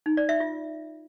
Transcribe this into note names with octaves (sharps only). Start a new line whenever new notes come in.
D#4
D5
E5
F4